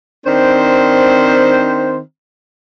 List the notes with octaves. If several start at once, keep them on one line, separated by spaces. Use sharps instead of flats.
D#3 C4 D4 C5